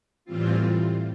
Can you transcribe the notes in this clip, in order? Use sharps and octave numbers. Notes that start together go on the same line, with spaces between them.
A2 E3 G3 C4 F4